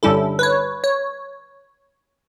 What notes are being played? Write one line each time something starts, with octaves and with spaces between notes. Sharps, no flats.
G2 D3 G3 C#4 E4 A4
B4
C#5
C#5